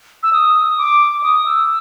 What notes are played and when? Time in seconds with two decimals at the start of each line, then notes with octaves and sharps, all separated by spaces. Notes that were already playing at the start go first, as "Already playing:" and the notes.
0.23 E6
0.33 D#6
0.78 D6
1.23 D#6
1.46 E6